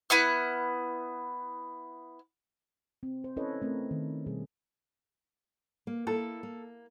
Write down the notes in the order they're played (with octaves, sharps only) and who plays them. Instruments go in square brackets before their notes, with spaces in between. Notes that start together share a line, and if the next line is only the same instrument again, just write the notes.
[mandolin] B3 E4 F#5 F6
[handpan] C4
C5
C#4 E4 A4 B4 C#5 D#5
A3 C4 A4 A#4
D#3
B2 G3 G#4
[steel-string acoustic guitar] A#3
[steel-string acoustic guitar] A#3 E4 [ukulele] A4
[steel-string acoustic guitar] A#3